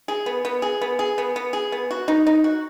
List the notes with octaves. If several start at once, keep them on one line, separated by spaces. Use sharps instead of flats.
G#4
B3
B3
G#4
B3
G#4
B3
B3
G#4
B3
F#4
D#4
D#4
F#4